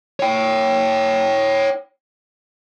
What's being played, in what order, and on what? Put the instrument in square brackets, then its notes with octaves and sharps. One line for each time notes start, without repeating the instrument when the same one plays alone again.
[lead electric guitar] C#5 G5